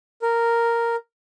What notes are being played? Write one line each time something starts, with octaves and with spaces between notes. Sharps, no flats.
A#4